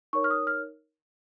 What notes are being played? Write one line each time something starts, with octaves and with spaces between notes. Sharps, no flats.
D#4 A#4 C#5 C#6
F6
D#6
F6